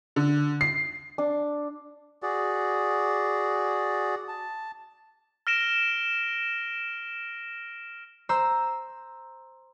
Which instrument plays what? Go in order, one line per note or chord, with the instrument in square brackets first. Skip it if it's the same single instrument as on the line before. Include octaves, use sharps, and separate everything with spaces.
[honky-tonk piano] D3
C7
[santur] D4
[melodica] F#4 G#4 D5
A5
[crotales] F6 A#6 D7 E7
[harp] C5 A#5 E6